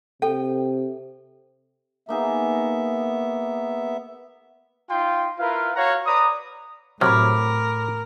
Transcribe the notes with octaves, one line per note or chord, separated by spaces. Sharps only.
C3 A4 G5
A#3 B3 D#4 G#4 E5
D#4 F4 G5 C6
E4 F4 A#4 B4 F5
F#4 C#5 F5 F#5 A#5
B4 D5 A#5 D#6
A2 C3 F#3 A#4 B5 D6 F6